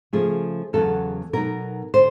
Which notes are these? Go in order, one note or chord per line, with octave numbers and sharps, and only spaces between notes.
C#3 F3 A3 G#4
E2 C#3 F#3 B3 A4
B2 F#3 B3 D#4 A#4
D3 C5